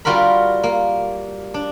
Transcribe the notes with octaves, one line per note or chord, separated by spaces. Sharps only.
G3 F4 F#4 A#4 B5
A#3
D4